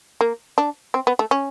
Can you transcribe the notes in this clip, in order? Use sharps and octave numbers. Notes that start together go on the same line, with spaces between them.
A#3
D4
C4
B3
A3
C#4